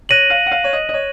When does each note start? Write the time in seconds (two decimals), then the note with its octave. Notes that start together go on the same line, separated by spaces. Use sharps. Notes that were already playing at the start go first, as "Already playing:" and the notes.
0.09 C#5 F#6 A#6 D#7 F#7
0.30 F5
0.46 F#5
0.51 F5
0.64 C#5
0.73 D#5
0.89 D#5
0.94 C#5